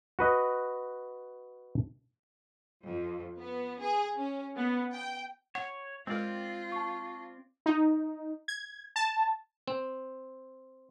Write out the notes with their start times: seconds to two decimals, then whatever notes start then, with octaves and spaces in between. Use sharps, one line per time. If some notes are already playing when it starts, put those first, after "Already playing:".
0.19 F#4 B4 D#5
2.84 F2
3.38 B3
3.80 G#4
4.18 C#4
4.56 B3
4.92 G5
5.55 C#5 F#5
6.07 G#3 C4 F4 A#4 D5
6.72 A5 C#6
7.66 D#4
8.48 G#6
8.96 A5
9.68 C4